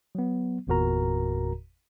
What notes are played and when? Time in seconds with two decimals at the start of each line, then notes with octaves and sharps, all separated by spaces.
0.15 F#3 B3
0.67 G1 E2 A#2 F#4 A#4 A#5